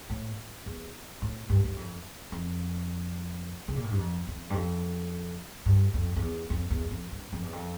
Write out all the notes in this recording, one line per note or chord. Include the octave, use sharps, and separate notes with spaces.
A2
E2
A2
G2
G2
F2
F2
C#3
A#2
A2
G2
F2
F2
G2
F2
G2
F2
F2
E2
F2
E2
F2
G2
F2
E2
F2